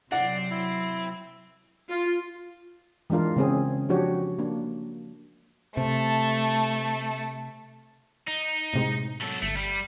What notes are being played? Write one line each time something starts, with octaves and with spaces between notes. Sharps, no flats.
C3 F#3 C4 D5 F#5
E4
F4
E3 G#3 D4 F4 A#4
C#3 G#3 C4 C#4 G#4
F3 D4 F#4 G4 C#5
A#3 D4
C3 A3 A5
D#4
A2 C3 G#3
F#3 A4
G1 A3 C#7
G3